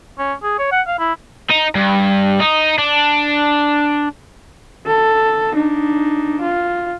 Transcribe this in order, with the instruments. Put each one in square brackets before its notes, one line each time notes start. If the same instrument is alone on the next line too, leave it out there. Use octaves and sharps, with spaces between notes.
[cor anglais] C#4
G#4
C#5
F#5
F5
E4
[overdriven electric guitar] D#4
G2
D#4
D4
[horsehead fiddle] A4
D4 D#4
F4